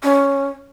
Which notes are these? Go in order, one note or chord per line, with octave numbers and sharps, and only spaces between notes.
C#4